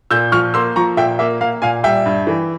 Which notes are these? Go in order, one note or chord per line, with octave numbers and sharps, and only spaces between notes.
A#2 E6 G6
F3 C#6 F6
A#3 C6 E6
F3 A#5 C#6
A#2 E5 G5
A#3 E5
A#3 F5
A#2 F5 G#5
G3 E5 G5
G2
E3